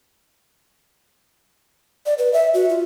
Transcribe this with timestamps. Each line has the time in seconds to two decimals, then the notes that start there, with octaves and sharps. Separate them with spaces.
2.06 D5
2.18 B4
2.33 E5
2.54 F#4
2.69 F4